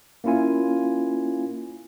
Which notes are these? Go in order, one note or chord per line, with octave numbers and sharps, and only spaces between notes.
A#3 C#4 E4 F4 G#5